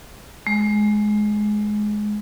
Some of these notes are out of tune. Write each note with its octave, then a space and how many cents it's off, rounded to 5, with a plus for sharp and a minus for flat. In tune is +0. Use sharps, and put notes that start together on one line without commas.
G#3 +15